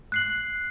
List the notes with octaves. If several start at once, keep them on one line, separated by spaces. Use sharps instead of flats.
F#6 C7 F#7